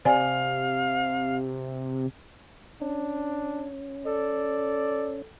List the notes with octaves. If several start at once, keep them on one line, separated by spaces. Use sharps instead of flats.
C3 C5 D5 F5 G#5
C#4 D4
A4 D5